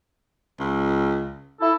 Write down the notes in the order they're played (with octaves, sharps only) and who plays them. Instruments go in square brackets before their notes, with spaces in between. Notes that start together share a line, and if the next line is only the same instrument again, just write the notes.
[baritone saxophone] C#2
[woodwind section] E4 A4